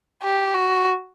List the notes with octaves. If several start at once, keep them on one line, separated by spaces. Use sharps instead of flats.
G4
F#4